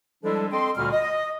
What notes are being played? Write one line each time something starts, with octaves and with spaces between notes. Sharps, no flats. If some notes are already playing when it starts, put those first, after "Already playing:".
F3 G3 G#3 D4 E4 A4
C4 A4 D#5 G5 C6
D2 A#2 D3 G3 F#4 F6
D#5